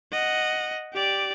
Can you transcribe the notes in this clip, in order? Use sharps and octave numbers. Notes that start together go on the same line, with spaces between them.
D#5 F#5
G4 D5